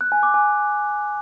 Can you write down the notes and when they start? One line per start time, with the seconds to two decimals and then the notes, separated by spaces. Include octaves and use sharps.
0.01 F#6
0.12 G#5
0.23 D6
0.34 G#5